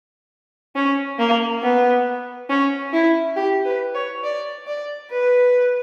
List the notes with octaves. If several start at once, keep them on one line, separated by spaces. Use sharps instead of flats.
C#4
A#3
B3
C#4
E4
G4
B4
C#5
D5
D5
B4